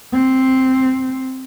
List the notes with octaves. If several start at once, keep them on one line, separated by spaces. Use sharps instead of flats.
C4